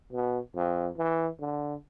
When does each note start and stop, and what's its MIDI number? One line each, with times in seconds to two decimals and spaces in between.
0.13 0.39 47
0.55 0.89 41
0.97 1.28 52
1.41 1.75 50